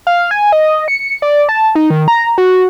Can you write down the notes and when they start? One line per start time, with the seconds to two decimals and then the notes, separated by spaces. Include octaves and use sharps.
0.07 F5
0.31 G#5
0.52 D#5
0.88 C#7
1.22 D5
1.49 A5
1.75 D#4
1.90 D#3
2.08 A#5
2.38 F#4